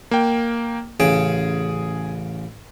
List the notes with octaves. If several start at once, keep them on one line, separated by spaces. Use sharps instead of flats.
A#3 G5
A1 C#3 G#4 G5